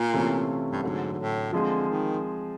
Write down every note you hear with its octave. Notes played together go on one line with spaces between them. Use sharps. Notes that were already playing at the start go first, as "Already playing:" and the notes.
Already playing: A#2
C3 E3 A3 C#4 F4
G2
G#2 D3 F#3 A3
G#2
A2
D3 F3 G#3 C4 F4 G#4
D#3